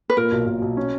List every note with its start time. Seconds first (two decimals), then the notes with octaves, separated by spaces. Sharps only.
0.10 B4
0.17 A#2 A#4
0.32 B1
0.47 B1
0.62 B1
0.77 C#4